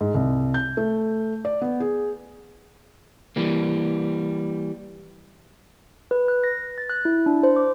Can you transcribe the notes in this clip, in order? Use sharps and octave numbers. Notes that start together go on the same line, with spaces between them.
G#2
C2
G6
A3
D5
B3
G#4
E3 G3 A#3
B4
F#6
A#6
A6
F#6
E4
D4
C5
D6